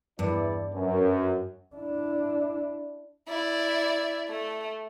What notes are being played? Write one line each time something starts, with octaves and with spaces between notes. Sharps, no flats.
E2 G2 E4 D5
F#2
D4 E4
E4 D5
A3